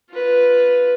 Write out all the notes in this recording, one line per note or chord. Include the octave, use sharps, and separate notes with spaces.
F4 B4